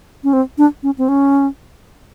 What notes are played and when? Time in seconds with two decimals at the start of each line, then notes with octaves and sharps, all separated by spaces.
0.24 C#4
0.33 C4
0.58 D4
0.83 C#4
0.98 C4
1.09 C#4